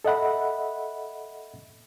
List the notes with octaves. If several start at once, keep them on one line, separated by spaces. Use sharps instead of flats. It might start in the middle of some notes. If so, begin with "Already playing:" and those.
A4 D#5 E5 F#5 B5